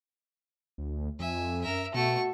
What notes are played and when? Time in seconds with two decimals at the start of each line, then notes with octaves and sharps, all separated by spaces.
0.78 D2
1.19 F2 E5 G#5
1.62 F#2 A#4 E5
1.94 B2 A3 F#4 C#6